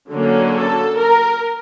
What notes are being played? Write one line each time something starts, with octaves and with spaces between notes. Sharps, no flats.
D3 F#3 A#3 C#4
A4
A#4